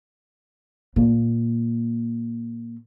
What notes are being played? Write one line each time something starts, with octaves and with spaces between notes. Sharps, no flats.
A#2 A#3